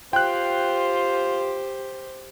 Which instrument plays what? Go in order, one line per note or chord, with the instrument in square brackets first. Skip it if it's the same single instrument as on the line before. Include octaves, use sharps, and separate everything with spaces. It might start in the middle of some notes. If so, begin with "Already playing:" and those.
[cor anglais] F4 [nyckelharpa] G4 C5 [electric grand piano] G5 F#6